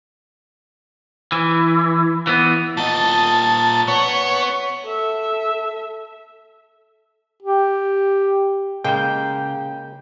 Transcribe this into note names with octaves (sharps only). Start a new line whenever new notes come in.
E3
E3 B3
A#2 D#5 A5
B3 C#5
A4 E5
G4
C#3 G#3 A#3 G5 G6